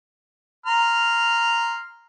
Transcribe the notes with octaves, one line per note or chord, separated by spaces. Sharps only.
A#5 C6 F6